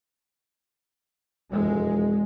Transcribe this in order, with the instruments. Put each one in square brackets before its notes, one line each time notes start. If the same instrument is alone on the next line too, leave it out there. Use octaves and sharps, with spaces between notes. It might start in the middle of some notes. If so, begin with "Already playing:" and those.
[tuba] E1 [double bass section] F2 G#3